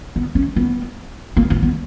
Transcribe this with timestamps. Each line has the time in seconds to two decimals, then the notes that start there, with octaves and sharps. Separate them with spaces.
0.16 B3
0.35 C#4
0.56 B3
1.36 A#3
1.50 B3
1.63 B3